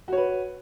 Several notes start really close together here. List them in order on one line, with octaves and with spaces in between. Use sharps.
F#4 C#5 B4